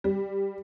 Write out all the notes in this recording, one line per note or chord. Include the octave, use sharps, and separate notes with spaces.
G3